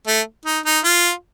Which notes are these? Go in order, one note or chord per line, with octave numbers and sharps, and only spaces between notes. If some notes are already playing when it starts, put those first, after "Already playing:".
A3
D#4
D#4
F4